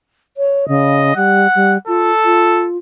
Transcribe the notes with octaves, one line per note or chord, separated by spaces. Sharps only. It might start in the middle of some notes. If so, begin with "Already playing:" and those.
C#5
C#3 D#5
G3 F#5
G3
F4 A4
F4